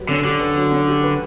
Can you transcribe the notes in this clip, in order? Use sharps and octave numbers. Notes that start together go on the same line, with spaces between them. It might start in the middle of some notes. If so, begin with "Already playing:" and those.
Already playing: F#3 G4 B4
D3 C#4
D3 G4
B4
F#3
C#4
G4
B4